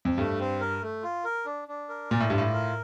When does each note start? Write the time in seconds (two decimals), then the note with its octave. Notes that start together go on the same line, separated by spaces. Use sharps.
0.05 F2
0.18 G2 A3
0.40 C4
0.61 A#4
0.82 A3
1.03 F4
1.24 A#4
1.46 D4
1.68 D4
1.89 A#4
2.11 A#2 D5
2.20 A2
2.30 G2 F4
2.38 A2
2.54 A#4